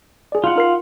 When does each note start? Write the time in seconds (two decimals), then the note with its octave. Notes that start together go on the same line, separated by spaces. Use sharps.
0.32 G#4 D5
0.44 F4 F#5
0.56 D#4 A#4 C7